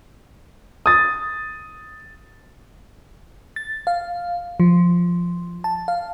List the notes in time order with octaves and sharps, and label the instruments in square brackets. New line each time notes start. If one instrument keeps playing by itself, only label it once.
[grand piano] D#6 A6
[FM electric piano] A6
F5
F3
A5
F5